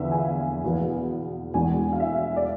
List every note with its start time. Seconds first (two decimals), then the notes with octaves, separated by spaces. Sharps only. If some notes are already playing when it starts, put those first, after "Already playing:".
Already playing: E2 D3 F3 B3 E5 F5
0.12 G#5
0.18 F5
0.64 E2 B2 B3
1.54 E2 B2 G#3 D4 G#5
1.93 F5
2.00 E5
2.36 D5